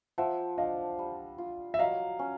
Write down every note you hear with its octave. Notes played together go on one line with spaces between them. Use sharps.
F3 E5 F#5
D4 D#5 F5
G3
F4
E5
F#3 D#5 F5
C#4